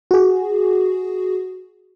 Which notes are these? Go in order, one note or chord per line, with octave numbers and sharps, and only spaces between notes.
F#4 G#4